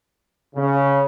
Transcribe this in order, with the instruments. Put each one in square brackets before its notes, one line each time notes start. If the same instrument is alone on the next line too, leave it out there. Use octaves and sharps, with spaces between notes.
[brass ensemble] C#3